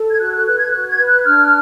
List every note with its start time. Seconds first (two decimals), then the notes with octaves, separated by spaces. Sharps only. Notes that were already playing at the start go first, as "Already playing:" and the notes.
Already playing: A4
0.10 G#6
0.20 F#4 F#6
0.33 F#6
0.46 B4 F#6
0.58 G#6
0.71 F#4 F#6
0.89 G#6
0.98 B4
1.07 F#6
1.24 D4 F6